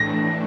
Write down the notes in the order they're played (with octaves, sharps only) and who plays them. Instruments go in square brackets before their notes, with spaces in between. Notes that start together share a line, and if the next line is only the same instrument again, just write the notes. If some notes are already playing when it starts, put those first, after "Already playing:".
Already playing: [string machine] A2 E3 A3 D4 [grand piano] A#6